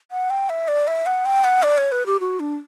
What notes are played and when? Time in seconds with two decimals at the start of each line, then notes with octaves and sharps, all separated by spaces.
0.11 F#5
0.30 G5
0.49 E5
0.68 D5
0.87 E5
1.06 F#5
1.26 G5
1.44 F#5
1.63 D5
1.77 C#5
1.92 B4
2.06 G4
2.20 F#4
2.40 D4